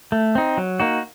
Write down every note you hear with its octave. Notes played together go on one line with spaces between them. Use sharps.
A3
C4 D#4
F#3
A#3 D#4 F#4